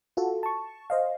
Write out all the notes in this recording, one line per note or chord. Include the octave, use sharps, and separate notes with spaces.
F4 F#4 A4
A5 C#6
C5 D#5 F5